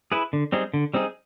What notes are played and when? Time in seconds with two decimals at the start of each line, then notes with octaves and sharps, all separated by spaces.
0.12 E4 G#4 B4
0.33 D3
0.52 G3 C4 D#4 G#4
0.74 D3
0.94 G3 C4 D#4 G#4